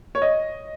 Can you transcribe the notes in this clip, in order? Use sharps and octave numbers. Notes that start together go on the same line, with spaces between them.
C#5
D#5